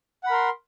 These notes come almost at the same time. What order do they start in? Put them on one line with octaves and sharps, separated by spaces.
F#5 B5 A#4 C6